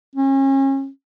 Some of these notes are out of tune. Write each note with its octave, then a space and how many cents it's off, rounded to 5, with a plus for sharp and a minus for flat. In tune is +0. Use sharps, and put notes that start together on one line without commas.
C#4 -35